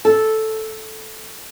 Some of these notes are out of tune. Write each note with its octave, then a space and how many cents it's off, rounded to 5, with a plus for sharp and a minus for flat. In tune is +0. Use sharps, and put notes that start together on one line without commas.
A4 -5